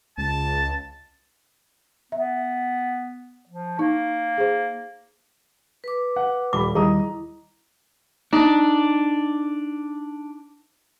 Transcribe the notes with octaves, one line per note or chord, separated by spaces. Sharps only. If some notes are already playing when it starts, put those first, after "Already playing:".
C#2 A5
B3 E5
F3
A#3 D#4
G#4 C5
B4 D6
F#5
D#1 G3 B5 D6
D#2 D#3 G3 E4 G#4 D#5 A#5 D#6
D4 D#4